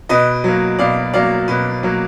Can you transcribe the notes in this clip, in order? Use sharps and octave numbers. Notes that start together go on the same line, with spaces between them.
B2 B4 D#5
F#3 A#3
B2 D5 F5
F#3 A#3 D5 F5
B2 B4
F#3 A#3